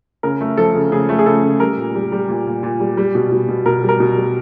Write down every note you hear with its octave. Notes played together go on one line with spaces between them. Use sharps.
C#3 A#4
A3
F3 A4
C#3
C#3 G#4
A3
G#4
C#3 A4
C#3
G3 A#4
A#2
G3
G3
A#2
A#2
A#2
G3
G3
B2
B2
B2
B2 A#4
G3
A#4
B2
G3